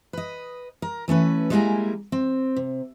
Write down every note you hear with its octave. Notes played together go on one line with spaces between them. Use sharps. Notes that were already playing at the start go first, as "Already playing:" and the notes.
B4 D#5
A#4
E3 A3 C#4 B4
G3 G#3 A#3 E4 G#5 A#5
C4
C3